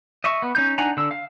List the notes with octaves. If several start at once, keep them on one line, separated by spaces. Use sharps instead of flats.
D#5 E5 C#6
B3
C#4 D#4 G6
D4 D#4 F#5 G#5 A#5
D3 E6
F5